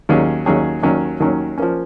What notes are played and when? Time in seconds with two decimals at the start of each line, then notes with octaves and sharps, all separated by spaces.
0.09 D#2 D#3 F#3 C#4 G#4
0.46 D#2 D#3 F#3 C#4 G#4
0.83 D#2 D#3 F#3 C#4
1.20 D#2 D#3 F#3 C#4
1.58 F3 A#3 C#4